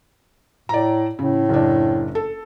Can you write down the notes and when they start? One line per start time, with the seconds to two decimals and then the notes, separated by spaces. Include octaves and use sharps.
0.69 A2 D5 A#5
1.19 A2 C#3
1.49 F#1 D4
2.15 A4